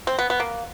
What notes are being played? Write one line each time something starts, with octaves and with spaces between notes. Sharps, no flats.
C4
B3
B3
A#3